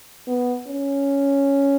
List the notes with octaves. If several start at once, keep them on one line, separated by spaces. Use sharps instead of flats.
B3
C#4